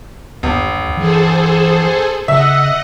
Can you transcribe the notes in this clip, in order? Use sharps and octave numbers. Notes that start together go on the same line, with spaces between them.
G1 D#2
E3 G#4 A4 C5
C#3 D#5 E5 F#5